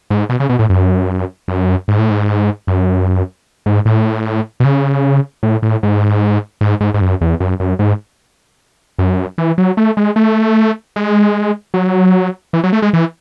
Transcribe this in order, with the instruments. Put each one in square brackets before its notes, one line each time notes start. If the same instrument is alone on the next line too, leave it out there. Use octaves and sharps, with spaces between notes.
[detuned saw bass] G#2
B2
C#3
B2
A2
F#2
F#2
G#2
A2
G#2
F#2
G#2
A2
B2
C#3
A2
A2
G#2
G#2
G#2
G#2
F#2
E2
F#2
F#2
G#2
F#2
E3
F#3
A3
G#3
A3
G#3
F#3
E3
F#3
A3
G#3
E3